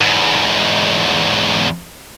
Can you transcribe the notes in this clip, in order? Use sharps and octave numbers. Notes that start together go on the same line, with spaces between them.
E2 G#2